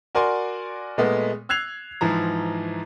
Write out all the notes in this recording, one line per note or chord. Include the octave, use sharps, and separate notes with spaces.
F#4 A#4 D5 G#5 C6
A#2 G#3 A3 B3
E6 F#6 G#6 C7 F7
G#2 E3 F3 A#5